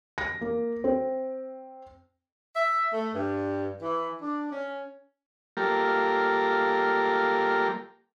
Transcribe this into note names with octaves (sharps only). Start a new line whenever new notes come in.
A#6
A#3
C4
E5
A3
G2
E3
D4
C#4
G3 A#3 F4 G4 A4 A#4